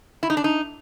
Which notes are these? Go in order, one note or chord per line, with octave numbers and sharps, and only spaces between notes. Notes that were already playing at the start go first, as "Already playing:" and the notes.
E4
D#4
D4
D#4